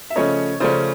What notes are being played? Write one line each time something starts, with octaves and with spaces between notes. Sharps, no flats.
E5
C#3 F3 A3 C#4 C#5 D#5
C#3 F3 A3 C#4 C5 D5